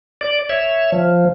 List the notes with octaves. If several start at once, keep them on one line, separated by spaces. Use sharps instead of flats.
D5
C#5 E5
F3